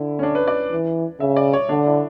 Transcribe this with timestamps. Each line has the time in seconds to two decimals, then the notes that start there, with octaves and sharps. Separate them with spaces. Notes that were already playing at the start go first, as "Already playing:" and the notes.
Already playing: D3 E4
0.19 C#4
0.23 D4
0.35 B4
0.48 D5
0.72 E3
1.20 C#3 E5
1.37 D5
1.53 C#5
1.69 D3 D4
1.86 E4